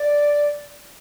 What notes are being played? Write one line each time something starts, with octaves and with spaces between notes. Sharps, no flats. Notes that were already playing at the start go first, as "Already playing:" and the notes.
Already playing: D5